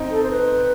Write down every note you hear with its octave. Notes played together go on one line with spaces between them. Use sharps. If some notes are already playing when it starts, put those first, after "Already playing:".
Already playing: C4 D#4
A4
C5
B4